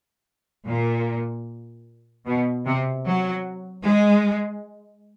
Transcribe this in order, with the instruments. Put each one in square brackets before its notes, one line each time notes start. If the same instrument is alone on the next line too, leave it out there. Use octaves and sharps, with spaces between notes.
[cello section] A#2
B2
C3
F#3
G#3